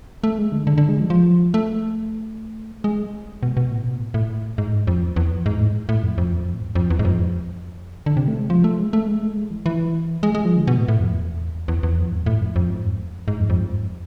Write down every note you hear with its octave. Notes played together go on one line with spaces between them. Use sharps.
A3
G#3
D3
D3
D3
G#3
F3
F3
A3
G#3
B2
B2
A2
B2
A2
A2
G#2
F2
E2
E2
F2
G#2
A2
A2
F2
F2
E2
F2
A2
G#2
F2
E2
G#2
F2
D3
C3
A3
G#3
F3
A3
G#3
A3
G#3
A3
G#3
E3
E3
G#3
G#3
F3
D3
B2
A2
A2
F2
E2
E2
E2
F2
G#2
A2
F2
F2
G#2
F2
E2
F2
G#2
F2
F2
G#2
F2